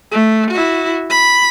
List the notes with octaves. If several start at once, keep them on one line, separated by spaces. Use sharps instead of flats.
A3
E4 F#4
B5